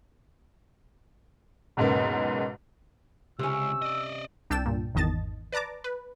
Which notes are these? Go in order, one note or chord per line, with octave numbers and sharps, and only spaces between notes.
B1 E2 G#2 C#3 A#3 B3
C#2 C3 C#4 E6
D5 D#5
C2 D4 G5 A5 E6 E7
G2 A#2
G#1 E2 D#3 D#5 A5 A6
B4 D5 A5 A#5 D6
B4